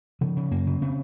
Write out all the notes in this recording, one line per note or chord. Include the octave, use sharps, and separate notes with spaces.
C#3 F3
C#3
F#2 A#3
C#3
C#3 C4